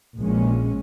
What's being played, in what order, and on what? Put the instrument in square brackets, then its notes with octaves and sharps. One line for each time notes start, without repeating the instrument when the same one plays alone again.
[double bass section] A#1 A#2 G#3 C#4